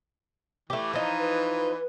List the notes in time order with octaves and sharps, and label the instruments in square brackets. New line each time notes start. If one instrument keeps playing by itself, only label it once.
[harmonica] E3 [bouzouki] A3 G4
[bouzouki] F3 D#4
[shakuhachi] B4